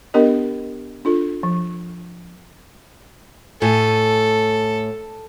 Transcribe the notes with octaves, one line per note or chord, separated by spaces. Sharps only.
B3 D4 G4 A#4 D#5
D4 F4 A4
F3
A2 A4 G#5